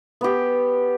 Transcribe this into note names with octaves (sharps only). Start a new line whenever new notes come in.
B3 G4